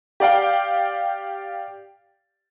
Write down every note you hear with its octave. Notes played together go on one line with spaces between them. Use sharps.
G4 D5 F5 G5